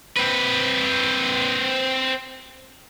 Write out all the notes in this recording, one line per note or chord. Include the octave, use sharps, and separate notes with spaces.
C4 B4